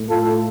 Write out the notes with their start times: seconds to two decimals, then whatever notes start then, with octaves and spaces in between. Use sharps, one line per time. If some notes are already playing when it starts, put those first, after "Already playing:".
Already playing: A2 A3
0.08 F4 A4